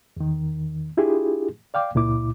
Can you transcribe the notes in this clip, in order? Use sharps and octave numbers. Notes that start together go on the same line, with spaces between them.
E2 D#3
D4 E4 F4 G4 G#4
D5 F5 G5 D6
C#2 A#2 E4 D6